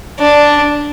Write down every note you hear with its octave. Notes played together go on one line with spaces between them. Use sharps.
D4